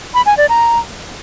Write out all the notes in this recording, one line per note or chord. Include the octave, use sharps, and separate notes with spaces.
B5
G#5
D5
A#5